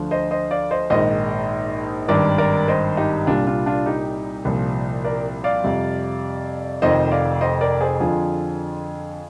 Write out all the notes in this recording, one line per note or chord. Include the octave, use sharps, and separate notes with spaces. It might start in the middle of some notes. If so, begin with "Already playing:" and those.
Already playing: D2 D3 F3
C5 D#5
C5 D#5
D5 F5
C5 D#5
A#1 G#2 D#3 C5 D#5
G#1 G2 D#3 A#4 D5
A#4 D5
C5 D#5
D#4 G4
C2 A#2 G3 D4 F4
D4 F4
D4 F4
D#4 G4
C2 A#2 F3
A#4 D5
D5 F5
F2 C3 G3
F1 F2 D#3 C5 D#5
D5 F5
C5 D#5
A#4 D5
G#4 C5
F2 D3 F3 F4 G#4